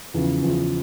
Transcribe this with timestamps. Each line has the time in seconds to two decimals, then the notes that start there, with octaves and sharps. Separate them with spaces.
0.14 E2 C#3 F3
0.42 E2 C#3 F3